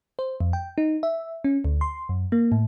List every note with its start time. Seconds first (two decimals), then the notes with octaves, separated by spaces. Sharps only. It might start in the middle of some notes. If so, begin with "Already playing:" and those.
0.19 C5
0.40 F2
0.53 G5
0.78 D#4
1.03 E5
1.44 C#4
1.65 D2
1.81 C6
2.09 F#2
2.32 A#3
2.52 A2